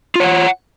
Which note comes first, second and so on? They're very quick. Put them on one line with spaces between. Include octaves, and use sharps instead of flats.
F4 C#5 F#5